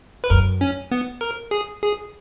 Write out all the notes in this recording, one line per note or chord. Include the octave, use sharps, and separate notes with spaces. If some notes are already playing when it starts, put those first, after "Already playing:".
B4
F#2 A#4
C#4
B3
A#4
G#4
G#4